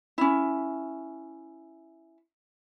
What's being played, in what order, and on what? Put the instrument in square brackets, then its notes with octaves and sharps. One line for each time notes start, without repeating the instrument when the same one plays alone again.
[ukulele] C#4 E4